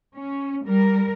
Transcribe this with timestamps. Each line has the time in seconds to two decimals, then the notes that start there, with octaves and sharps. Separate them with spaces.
0.16 C#4
0.66 G3 A#4